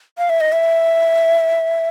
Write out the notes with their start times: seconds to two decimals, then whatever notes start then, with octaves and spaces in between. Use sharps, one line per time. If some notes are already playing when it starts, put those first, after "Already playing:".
0.18 F5
0.30 E5
0.41 D#5
0.52 E5